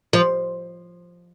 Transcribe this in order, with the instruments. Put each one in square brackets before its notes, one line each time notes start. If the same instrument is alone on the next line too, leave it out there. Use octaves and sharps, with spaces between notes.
[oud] F3